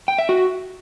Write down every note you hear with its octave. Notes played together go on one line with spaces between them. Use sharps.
G5
E5
F#4